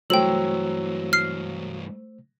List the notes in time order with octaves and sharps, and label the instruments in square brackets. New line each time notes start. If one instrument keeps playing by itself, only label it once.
[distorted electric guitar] G2 E3 [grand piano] F#3 [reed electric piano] A3 C5 E6 [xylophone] G5 F#7
[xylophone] F6 C7